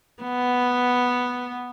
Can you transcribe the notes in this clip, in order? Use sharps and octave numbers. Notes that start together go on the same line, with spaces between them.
B3